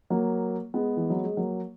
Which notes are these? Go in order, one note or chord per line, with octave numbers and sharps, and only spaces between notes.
F#3 A#3
G#3 B3
E3
F#3
G#3
F#3 A#3